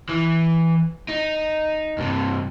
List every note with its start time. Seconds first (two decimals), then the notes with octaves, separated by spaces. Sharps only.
0.09 E3
1.09 D#4
1.98 G2 C3